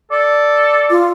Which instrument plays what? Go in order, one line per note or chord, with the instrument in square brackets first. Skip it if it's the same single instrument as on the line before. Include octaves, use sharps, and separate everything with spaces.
[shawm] A4 [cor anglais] D5
[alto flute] F4